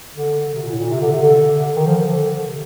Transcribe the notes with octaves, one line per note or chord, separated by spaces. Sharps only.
D3
D3
C3
A#2
A2
A#2
C3
D3
C3
D3
D#3
F3
F3
D3
C3